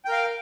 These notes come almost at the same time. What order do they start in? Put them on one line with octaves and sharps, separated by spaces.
G5 A#4 F5